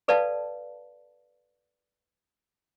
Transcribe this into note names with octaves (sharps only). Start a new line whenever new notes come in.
A4 B4 D5 F5 A5